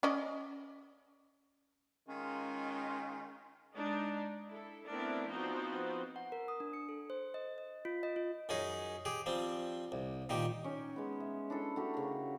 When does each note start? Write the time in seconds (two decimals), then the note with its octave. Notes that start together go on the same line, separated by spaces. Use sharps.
0.03 C#4 D5 D#5
2.08 D#3 G#3 C#4 F4
3.75 G#3 D4 D#4 D5
4.47 E4 A4
4.90 A3 B3 C4 D4 E4 A#4
5.30 F3 B3 C4 D#4 F#4 C5
6.16 F#5
6.32 A#4
6.48 D#6
6.60 D4
6.73 C#7
6.89 A4
7.10 C5
7.34 D#5
7.58 D#5
7.85 F4
8.03 D#5
8.16 F4
8.49 F#2 C#4 D#4 G#4
9.05 G4 G#4
9.26 F3 G3 C4
9.92 C2
10.29 A#2 D#3 G4
10.64 C#4 D#4
10.96 G#3 B3
11.20 E5
11.50 D4 E4 A4
11.76 A3 F#4 G4 A#4
11.94 C#3 A#4